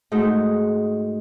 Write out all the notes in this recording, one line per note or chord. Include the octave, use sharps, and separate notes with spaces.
G#2 A3 D#4 F#4